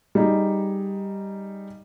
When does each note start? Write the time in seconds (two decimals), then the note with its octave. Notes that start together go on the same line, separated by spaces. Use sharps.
0.15 G3 D#4 G#4